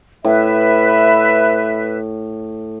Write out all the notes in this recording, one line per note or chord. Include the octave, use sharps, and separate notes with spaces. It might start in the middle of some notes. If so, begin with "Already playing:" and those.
A2 B4 E5